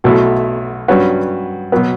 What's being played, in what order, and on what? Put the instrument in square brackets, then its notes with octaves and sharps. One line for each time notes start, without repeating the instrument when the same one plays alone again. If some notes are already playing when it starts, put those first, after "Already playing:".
[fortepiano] B1 B2 F#3 A3 E4
G2 F#3 C#4 F#4 B4
B2 F#3 B3